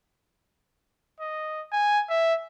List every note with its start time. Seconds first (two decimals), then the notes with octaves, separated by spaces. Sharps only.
1.20 D#5
1.72 G#5
2.10 E5